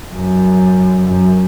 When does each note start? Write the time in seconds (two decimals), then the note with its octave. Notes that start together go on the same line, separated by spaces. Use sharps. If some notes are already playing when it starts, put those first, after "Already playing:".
0.13 F#2
1.07 F#2